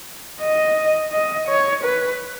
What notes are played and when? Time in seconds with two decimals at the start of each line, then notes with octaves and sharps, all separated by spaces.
0.41 D#5
1.12 D#5
1.48 C#5
1.84 B4